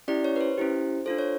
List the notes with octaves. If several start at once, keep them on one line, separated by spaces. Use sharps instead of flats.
C#4 E4 G4 D5
C#5
B4
C5
C#4 E4 G4
D4 F4 A4 C5
C#5